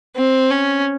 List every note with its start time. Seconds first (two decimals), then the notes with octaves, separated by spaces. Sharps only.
0.16 C4
0.51 C#4